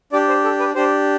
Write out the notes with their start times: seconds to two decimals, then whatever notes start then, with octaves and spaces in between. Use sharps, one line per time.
0.13 D4 G4 D5
0.28 C5
0.44 A4
0.60 B4
0.75 D4 G4 C5